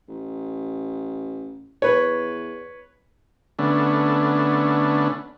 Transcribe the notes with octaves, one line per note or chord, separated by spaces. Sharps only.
A1
E2 B4 C#5
D3 A3 B3 C#4 D4